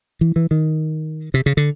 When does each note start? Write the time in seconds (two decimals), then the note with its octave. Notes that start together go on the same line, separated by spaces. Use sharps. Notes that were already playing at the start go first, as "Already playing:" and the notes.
0.21 E3
0.36 E3
0.51 D#3
1.34 C3
1.46 C#3
1.57 D3